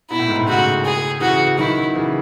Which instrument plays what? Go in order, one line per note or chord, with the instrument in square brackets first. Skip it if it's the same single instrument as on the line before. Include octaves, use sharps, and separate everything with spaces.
[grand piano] B2 [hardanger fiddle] E4
[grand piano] A2
G#2
A2
[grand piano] A2 C#3 [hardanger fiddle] F#4
[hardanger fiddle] G#4
[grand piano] C#3 E3 [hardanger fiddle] F#4
[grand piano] D#3 F#3 [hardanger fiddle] E4
[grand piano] C#3 E3